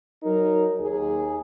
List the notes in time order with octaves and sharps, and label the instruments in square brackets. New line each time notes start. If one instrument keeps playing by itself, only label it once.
[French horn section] F#3 D#4 A#4
D#2 G#4